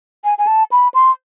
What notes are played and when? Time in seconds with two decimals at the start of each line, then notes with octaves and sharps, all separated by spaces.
0.24 G#5
0.38 G#5
0.47 A5
0.72 B5
0.94 C6